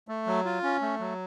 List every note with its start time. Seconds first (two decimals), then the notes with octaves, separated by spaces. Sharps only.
0.08 A3
0.27 F#3
0.45 F4
0.63 C#4
0.81 A3
0.99 F#3